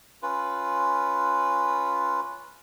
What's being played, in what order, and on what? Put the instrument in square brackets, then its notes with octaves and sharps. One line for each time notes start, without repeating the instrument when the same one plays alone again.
[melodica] C#4 F4 B4